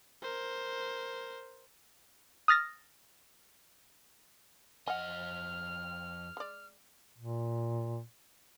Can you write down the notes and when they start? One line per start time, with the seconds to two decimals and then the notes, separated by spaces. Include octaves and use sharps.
0.22 A#4 C5
2.48 D#6 F6 A6 A#6
4.87 F2 D#5 F#5 G#5 F6
6.37 G#3 D5
7.18 A#2